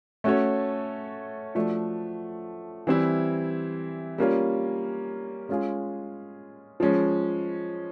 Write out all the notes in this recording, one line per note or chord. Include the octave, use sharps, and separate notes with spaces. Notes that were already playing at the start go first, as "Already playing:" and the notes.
A3 C#4 F#4 A4 C#5
F3 A3 D4 F#4
E3 G3 C4 E4
G3 A#3 C#4 F4
G#3 C#4 F4 G#4
F3 G#3 C#4